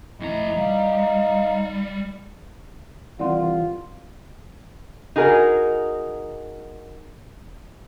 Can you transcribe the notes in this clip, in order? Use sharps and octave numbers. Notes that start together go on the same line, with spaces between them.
F2 A3 D#4 E4 A#5
G3 F5 A#5
C2 E3 F4 D5 F#5 C6
D#4 F#4 G#4 A#4